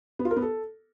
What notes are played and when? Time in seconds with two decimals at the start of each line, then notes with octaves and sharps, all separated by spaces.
0.19 B3
0.25 F4
0.31 A#4
0.36 B3
0.42 A4